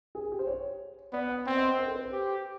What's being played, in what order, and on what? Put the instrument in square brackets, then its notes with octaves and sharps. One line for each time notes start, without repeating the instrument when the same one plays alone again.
[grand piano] G#4
G4
C5
C#5
[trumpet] B3 [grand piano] D5
[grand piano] F#5
[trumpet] C4 [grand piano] G5
[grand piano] D#5
C5
A#4
A4
B4
C5
[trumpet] G4